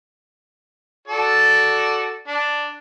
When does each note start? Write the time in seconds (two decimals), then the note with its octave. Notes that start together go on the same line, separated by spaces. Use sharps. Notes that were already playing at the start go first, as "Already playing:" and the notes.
1.08 F#4 A4 D5
2.28 D4